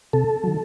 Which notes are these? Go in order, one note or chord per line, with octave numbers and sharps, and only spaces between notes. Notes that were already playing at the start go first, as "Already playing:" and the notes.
C3 A4
D#3 F#3